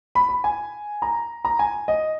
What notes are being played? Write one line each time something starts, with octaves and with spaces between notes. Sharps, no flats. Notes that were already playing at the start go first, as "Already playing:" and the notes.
B5
B5
G#5
A#5
A#5
G#5
D#5